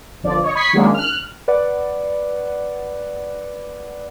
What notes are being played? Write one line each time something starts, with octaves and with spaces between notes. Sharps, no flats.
G1 F3 D5
C#5 D#5
B5 C#6 D#6 G#6 B6 C7
D#3 F#3 G#3 A#3 C#4 D4
F6 F#6
B4 D5 F#5